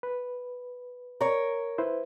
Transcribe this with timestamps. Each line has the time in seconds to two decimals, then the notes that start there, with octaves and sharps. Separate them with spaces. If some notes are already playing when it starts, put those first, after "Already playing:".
0.03 B4
1.21 A#4 C#5
1.78 E4 B4 C5